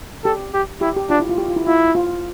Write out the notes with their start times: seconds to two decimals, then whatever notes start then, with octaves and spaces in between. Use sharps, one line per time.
0.24 G4 A4
0.54 G4
0.81 E4 G4
0.96 G4
1.10 D4 F4
1.20 E4
1.29 F4
1.38 G4
1.48 F4
1.56 E4
1.67 E4 F4
1.95 F4